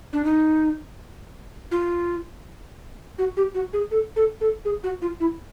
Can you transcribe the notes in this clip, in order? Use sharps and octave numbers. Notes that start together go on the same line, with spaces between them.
D4
D#4
F4
F#4
G4
F#4
G#4
A4
A4
A4
G#4
F#4
F4
E4